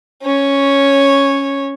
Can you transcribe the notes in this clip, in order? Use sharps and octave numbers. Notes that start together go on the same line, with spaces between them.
C#4 C#5